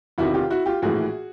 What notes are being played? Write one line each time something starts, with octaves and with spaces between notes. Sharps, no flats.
E1 E2 C3 D#3 E4 F#4
F4 G4
E4 F#4
F4 G4
A#1 A2 E3 F#4 G#4